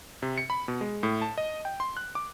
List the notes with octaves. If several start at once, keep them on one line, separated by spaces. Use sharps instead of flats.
C3
C#7
B5
B2
G#3
A2
A5
D#5
G5
C6
F#6
D6